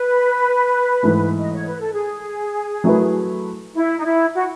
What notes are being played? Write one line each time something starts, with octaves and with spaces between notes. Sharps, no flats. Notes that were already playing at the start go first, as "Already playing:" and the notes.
Already playing: B4
G#2 E3 A3
D#5
C#5
B4
A4
G#4
F#3 A3 E4 B4
E4
D#4
E4
F#4